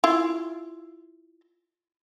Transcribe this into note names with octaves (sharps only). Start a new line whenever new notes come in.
E4 F4